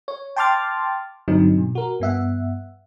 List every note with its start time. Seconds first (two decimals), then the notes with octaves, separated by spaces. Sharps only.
0.08 C#5
0.36 G5 A5 C6 D6 F6 A6
1.28 G2 D3 F#3 C4 D#4
1.58 B2
1.75 F#4 A#4
2.00 G2 B3 E5 F#5